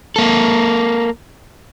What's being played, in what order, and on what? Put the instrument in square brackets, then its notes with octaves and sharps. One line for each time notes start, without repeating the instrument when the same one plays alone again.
[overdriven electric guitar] A#3 A4